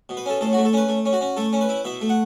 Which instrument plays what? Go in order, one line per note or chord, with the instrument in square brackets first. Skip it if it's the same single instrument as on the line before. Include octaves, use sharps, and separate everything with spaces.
[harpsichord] B2
B4
C#4 A4
A2 A4
A3 F#4
A4
C#4 B4
A3
C#4
F#4
C#4
A3 A4
C#4
B4
E4
B2 E5
A3
F#5